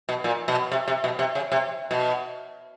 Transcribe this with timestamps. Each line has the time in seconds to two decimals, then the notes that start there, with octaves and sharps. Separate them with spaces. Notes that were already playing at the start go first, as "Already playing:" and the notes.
0.09 B2
0.24 A#2
0.48 B2
0.72 C3
0.88 C3
1.04 B2
1.19 C3
1.35 C#3
1.52 C3
1.91 B2